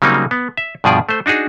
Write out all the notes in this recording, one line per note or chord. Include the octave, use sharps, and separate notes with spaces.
C#3 F#3 G3 A#3 C4 D#4
B3
E5
G2 B2 F3 G#4 D5
A3 C5
D4 D#4 F#4 G#4